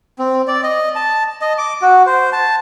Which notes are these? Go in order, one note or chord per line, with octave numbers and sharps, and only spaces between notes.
C4
D5
D#5
A5
D#5
D6
F#4
C5
A5